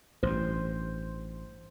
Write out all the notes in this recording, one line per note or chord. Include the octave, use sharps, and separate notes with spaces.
A1 G2 C5